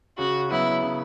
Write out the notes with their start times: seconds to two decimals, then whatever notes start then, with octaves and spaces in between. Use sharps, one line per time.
0.18 C#3 F#4
0.50 F#3 B3 E4
0.82 C#3